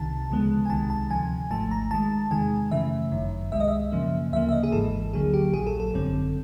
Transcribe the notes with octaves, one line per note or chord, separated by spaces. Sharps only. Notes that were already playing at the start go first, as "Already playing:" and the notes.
Already playing: C2 C3 D#3 A5
D2 C#3 F3 G#3 B3
G#5
C2 C3 D#3 G#3 A5
A5
D2 C3 F3 G#5
G#1 G#2 F3 A3 A5
A#5
D#2 D#3 G#3 A5
E2 C3 D#3 G#3 G#5
F#2 C#3 E3 A3 E5
G1 F#2 D#3
C2 B2 G#3 E5
D#5
E5
F#2 C#3 F3 A#3
D2 C#3 F3 A#3 E5
E5
D#5
G#4
G#1 G#2 E3 A4
D2 D3 F#3 A#3 G#4
G4
A#1 A#2 F#3 G#4
A4
A4
G#1 F#2 D3 G3 C4